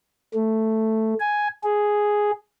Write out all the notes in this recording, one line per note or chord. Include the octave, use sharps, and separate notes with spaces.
A3
G#5
G#4